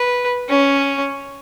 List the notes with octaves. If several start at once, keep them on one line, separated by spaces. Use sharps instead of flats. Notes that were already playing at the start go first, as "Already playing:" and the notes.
Already playing: B4
C#4